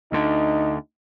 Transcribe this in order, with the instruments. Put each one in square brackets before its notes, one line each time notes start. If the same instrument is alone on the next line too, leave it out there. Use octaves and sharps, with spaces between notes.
[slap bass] D2 D3 [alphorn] D#4